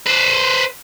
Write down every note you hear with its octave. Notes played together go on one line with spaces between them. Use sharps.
B4 C5